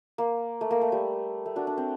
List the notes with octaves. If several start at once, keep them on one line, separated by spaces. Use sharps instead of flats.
A#3
A3
A#3
A3
G3
A3
D4 F#4
D4
C4